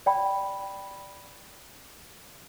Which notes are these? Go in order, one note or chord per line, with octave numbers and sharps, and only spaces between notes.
D5 G5 B5